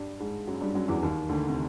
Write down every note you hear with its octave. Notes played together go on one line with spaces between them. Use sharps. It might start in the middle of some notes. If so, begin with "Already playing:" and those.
Already playing: G2 G3
G#2 G#3
F#2 F#3
G2 G3
F#2 F#3
E2 E3
D#2 D#3
D2 D3
C3